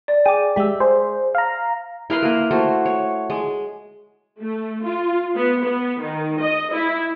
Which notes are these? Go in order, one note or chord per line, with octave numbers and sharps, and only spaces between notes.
D5
G#4 G5 D6 D#7
G#3 G4 E5 E6
G#4 C5
F5 A#5
E4 A#4 B4 C6
A#3 A#4
A3 F#4 C5
C#5
G#3
A3
F4
B3
B3
D#3
D#5
E4